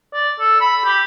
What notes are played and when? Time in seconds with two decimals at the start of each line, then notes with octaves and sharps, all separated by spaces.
0.13 D5
0.40 A4
0.61 B5
0.86 G4